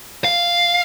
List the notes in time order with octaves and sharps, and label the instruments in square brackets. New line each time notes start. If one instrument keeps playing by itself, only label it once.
[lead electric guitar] F5